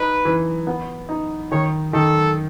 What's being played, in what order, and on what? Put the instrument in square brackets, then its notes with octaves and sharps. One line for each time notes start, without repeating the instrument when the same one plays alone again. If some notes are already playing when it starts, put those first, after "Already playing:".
Already playing: [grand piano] D#4 [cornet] B4
[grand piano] E3
B3
D#4
[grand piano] D#3 [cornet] C#5
[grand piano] D#3 [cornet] A4